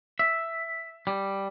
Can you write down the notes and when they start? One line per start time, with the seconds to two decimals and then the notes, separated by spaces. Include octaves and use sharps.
0.19 E5
1.07 G3